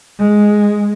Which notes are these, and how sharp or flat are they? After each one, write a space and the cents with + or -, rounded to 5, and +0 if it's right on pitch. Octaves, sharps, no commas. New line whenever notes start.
G#3 +0